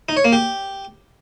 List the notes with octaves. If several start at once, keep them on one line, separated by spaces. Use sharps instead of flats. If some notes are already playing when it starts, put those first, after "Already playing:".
D#4
C#5
A#3
G4